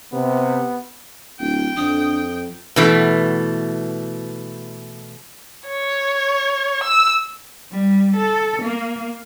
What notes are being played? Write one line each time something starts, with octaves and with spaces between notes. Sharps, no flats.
C3 B3
D1 G5
F2 D3 D#6
B2 E3 A3
C#5
E6
G3
A4
A#3